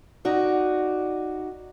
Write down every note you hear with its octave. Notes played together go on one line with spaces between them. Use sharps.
D#4 F#4 D5